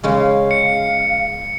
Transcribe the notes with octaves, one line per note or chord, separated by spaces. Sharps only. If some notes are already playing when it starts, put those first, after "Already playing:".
C#3 G#3 C#4 F5
C#7